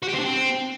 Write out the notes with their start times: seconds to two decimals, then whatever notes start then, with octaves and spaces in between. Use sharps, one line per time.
0.03 F#4
0.08 G4
0.14 C4
0.19 D4
0.25 C4